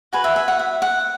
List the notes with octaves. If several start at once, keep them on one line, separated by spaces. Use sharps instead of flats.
F#4 B4 G#5
E5
E5
F#5
E5
F#5